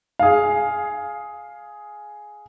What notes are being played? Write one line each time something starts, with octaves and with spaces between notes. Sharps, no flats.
G#4 F5